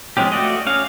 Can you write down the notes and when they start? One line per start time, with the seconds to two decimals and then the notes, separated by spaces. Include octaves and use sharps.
0.17 F3 G#3 C4 C#4 G4
0.32 A3 F#4 D5 D#5
0.67 C#4 F5